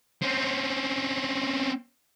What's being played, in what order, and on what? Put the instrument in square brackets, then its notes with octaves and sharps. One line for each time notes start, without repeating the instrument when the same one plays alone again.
[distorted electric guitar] C4 C#4